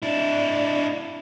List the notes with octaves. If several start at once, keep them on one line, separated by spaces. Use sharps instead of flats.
D4 E4